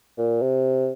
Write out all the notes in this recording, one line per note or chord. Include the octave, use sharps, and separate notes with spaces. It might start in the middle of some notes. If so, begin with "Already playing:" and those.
A#2
C3